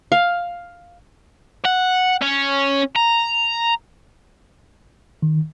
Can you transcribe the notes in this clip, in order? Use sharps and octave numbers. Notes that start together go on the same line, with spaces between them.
F5
F#5
C#4
A#5
D#3